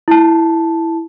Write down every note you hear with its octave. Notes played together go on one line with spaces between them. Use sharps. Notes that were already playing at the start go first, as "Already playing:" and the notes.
E4 A5